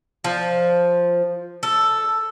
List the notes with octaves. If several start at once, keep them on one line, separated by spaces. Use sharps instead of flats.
F3
A4